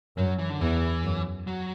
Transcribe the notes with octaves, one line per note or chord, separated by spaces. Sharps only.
F#2 F#3
E3
D3
E2 E3
F#2
F#3